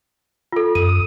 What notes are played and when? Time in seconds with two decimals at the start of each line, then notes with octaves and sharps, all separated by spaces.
0.52 F4 A4
0.75 F#2 D#6 D#7